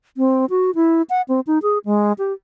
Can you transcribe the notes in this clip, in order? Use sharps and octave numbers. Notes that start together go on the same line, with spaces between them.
C4
F#4
E4
F#5
C4
D#4
G#4
G#3
G4